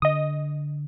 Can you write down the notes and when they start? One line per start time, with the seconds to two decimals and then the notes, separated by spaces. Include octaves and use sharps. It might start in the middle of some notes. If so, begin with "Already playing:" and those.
0.02 D3 D#5 D#6